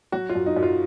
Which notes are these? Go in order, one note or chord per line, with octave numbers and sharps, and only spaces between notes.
F#3 F#4
F4
F#2
D#4
F#2
F4